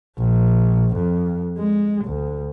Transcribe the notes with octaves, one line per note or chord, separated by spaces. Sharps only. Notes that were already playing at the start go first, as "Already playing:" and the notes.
A#1
F2
G#3
D2